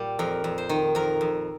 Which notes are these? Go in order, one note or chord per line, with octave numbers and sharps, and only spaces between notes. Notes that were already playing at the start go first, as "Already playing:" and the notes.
Already playing: A#2 G3
F2 A#4
F2
C5
D#3
F2 A#4
F2